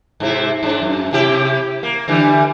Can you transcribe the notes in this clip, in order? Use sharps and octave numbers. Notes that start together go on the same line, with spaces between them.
G#2 C3 E4
G#2 D4
F#2
C3 E4 G4
A#3
D3 E3 G3